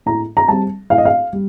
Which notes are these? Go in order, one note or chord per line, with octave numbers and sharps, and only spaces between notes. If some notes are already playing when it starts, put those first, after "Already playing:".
A2 A#5
A#5
G3 C4 A5
A2 F5
D#5
F5
G3